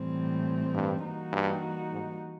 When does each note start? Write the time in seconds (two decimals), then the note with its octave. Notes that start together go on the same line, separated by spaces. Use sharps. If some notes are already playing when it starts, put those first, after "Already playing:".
Already playing: A2 E3 G3 C4
0.74 G2
1.04 E3 G3 A#3 D#4 F#4
1.33 G2
1.92 G#2